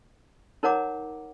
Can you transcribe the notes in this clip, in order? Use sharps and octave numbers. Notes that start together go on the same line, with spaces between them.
D#4 A#4 C#5 F#5 A#5 D6